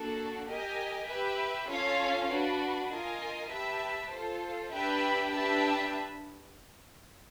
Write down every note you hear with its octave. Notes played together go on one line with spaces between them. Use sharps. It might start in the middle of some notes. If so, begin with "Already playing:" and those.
Already playing: A#3 D4 F#4 A4
G4 A#4 D#5 G#5
G4 B4 E5
C#4 F4 A4 C#5 F5
D4 F#4 B4
F4 A#4 D#5 G#5
G4 B4 E5 A5
F4 A4 C5
D4 G4 B4 E5 G5
D4 G4 B4 E5 A5